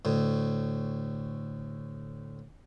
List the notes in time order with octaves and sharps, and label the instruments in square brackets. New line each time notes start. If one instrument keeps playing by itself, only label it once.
[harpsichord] D2 A2